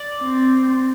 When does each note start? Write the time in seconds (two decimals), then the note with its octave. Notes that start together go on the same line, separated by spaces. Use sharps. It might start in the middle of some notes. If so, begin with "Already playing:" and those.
Already playing: D5
0.22 C4